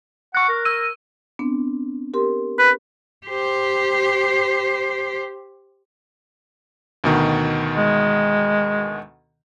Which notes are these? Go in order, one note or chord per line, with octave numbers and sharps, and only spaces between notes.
F#5 C#6 F#6
A#4
E6 D#7
B3 C4 D4
G4 A#4 C6
B4
G4 C5
D2 B2 D#3
G#3